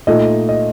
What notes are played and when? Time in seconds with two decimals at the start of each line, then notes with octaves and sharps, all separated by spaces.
0.07 A#2 A3 D#4 D#5
0.49 D#5